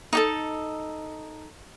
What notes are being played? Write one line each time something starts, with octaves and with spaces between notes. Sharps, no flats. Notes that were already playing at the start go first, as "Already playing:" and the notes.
D#4 G4 A4